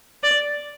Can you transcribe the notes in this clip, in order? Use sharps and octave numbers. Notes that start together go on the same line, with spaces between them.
D5